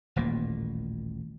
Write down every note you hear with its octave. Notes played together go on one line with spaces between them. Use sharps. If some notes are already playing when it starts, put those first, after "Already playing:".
D#1 A1 A#2 A#3